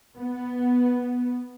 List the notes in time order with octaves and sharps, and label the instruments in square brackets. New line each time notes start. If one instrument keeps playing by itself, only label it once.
[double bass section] B3